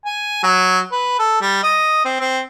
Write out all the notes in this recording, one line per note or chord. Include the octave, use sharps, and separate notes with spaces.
G#5
F#3
B4
A4
G3
D#5
C4
C4